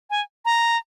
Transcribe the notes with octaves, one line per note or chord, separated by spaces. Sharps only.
G#5
A#5